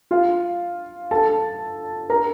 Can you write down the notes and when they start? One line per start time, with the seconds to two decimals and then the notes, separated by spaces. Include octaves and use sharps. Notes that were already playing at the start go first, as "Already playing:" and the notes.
0.11 F4 F5
1.11 A4 A5
2.10 A#4 A#5